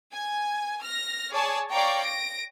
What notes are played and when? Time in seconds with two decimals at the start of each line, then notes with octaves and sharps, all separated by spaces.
0.12 G#5
0.81 F6 A#6
1.31 G#4 C#5 D5 G#5 A5
1.70 C#5 D5 F5 G5 A#5 C#6
2.02 A#6 D7